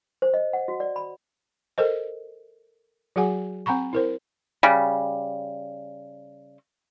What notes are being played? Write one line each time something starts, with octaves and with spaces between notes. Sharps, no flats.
C5
D#5
F#5
F#4
D5
B5
A4 A#4 C5 D#5
F#3 F#4 G#4 F#5 G#5
C4 F#5 A#5 B5 C#6
E4 A#4 C5
C#3 G3